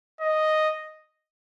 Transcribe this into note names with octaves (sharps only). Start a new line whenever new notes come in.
D#5